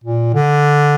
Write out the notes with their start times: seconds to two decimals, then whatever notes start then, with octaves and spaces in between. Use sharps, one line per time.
0.04 A#2
0.34 D3